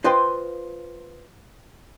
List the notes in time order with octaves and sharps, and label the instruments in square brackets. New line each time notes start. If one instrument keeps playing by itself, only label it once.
[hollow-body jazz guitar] F4 B4 C5 D#5 G5 C6